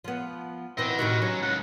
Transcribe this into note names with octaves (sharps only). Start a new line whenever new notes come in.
F3 B3
B2 E3 B3 C4 D#5 G5
A2 C3 D#3 F#4
F#3 C#4
C#2 F#5